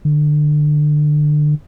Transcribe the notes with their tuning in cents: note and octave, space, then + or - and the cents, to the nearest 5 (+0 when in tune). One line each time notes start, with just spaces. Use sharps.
D3 +25